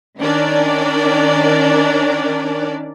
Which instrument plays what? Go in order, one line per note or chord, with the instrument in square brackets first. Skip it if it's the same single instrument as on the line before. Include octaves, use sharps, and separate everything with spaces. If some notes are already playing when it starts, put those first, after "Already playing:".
[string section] D#3 C#4 D4 A#4 D5